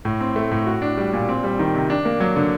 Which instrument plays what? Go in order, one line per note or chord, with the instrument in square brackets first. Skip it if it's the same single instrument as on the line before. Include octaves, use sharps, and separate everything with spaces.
[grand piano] A2
C4
A3
A2
F#4
D4
G3
A#2
C4
G3
D#3
C3
D4
A#3
F#3
D3